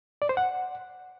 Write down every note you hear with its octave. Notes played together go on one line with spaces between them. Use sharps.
D5
C5
F#5